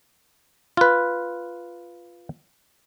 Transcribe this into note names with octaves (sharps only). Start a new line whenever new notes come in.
F4 B4